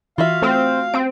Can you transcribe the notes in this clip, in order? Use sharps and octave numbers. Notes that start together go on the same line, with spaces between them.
E3 F4 F#4 E5 F5
A3 C4
C4 D7